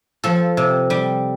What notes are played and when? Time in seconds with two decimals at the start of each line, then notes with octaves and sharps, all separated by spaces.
0.24 F3 A4
0.57 C3
0.90 G3